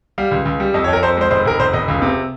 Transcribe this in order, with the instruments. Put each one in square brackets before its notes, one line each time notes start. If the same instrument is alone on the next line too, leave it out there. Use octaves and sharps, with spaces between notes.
[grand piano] G3 F5
C#2
C#2
G3
F2 D#5
C#5
F2
A#4
F2 C5
G#3 C5
F1 C5
F1 A#4
F1 C5
F1 D#5
C#2
C3